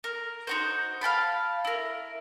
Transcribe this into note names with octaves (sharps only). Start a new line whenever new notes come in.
A#4
D#4 F#4 C5
F5 G5 A5 B5
E4 A#4